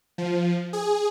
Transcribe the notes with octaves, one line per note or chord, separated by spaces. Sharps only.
F3
G#4